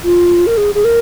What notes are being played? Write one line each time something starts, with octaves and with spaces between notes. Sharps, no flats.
F4
A#4
G#4
G#4
A#4